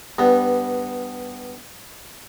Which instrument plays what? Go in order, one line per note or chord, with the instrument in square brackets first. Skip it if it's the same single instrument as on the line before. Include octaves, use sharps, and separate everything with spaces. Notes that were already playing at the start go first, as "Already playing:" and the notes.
[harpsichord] G2 B3